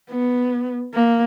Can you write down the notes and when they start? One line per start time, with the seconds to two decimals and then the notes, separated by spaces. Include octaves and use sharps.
0.10 B3
0.95 A#3